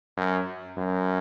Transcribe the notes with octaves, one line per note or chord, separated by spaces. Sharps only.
F#2
F#2